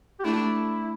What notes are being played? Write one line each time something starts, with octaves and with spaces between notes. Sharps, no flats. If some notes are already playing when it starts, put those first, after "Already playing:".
G4
A3 D4 E4